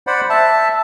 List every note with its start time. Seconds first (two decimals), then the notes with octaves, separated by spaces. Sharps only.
0.07 C5 D5 F#5 B5
0.30 E5 A5